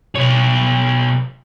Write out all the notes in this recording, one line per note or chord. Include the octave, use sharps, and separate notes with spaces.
B2 C#5